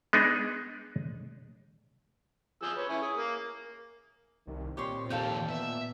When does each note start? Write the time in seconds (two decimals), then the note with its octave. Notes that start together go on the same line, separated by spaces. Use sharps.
0.13 G#3 B3 D4 D#4 G#4
2.62 F3 G#4 E6
2.77 B4 C#5
2.89 C#4 E4
3.02 G#4
3.16 A#3
4.47 C2 D#3
4.77 A#2 C4 G4 C#5 C6
5.10 D#2 C3 F3 A4 F5 G5
5.49 A#2 B3 E5